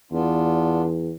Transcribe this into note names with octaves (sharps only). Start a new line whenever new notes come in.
E2 B3 D4 F4